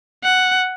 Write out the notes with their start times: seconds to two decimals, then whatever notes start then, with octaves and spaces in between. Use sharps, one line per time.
0.24 F#5